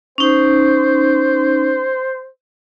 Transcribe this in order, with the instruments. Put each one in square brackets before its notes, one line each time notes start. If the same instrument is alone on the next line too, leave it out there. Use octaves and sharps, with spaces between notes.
[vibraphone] C#4 D#4 [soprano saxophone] C5